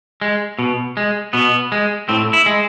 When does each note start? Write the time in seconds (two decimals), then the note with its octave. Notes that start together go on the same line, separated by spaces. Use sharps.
0.21 G#3
0.59 B2
0.97 G#3
1.33 B2 B3
1.72 G#3
2.09 A2 C4
2.33 E4
2.46 G#3